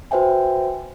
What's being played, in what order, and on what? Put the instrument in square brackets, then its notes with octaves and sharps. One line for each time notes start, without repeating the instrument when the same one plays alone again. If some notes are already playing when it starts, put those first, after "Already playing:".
[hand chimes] F#4 B4 C5 E5 G5 G#5